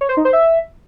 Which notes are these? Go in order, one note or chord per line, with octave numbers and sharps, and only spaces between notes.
C#5
C5
D#4
C5
E5